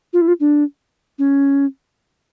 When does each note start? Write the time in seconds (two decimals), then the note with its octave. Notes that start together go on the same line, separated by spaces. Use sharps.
0.13 F4
0.21 E4
0.28 F4
0.40 D4
1.19 C#4